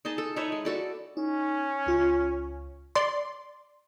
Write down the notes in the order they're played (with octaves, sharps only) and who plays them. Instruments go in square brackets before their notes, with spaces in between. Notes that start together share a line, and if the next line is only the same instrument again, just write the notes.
[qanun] D#4 G#4 D#5 A5
A4
D#4 B4 C#5 E5
G#3
F#4 A4 D5
[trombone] C#4 [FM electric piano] D#4
[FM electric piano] C#2 F4
[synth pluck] D5 C6